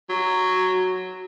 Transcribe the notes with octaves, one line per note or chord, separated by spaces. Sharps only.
F#3